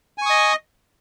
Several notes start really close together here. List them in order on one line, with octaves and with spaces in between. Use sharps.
G#5 C#6 D#6 D#5